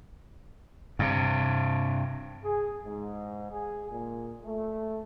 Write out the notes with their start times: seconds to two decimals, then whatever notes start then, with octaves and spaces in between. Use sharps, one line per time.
0.99 G2 C3
2.44 G#4
2.85 G#2
3.52 G#4
3.91 A#2
4.45 A3